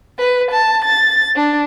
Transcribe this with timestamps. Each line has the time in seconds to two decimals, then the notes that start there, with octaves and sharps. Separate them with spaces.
0.18 B4
0.51 A5
0.84 A6
1.35 D4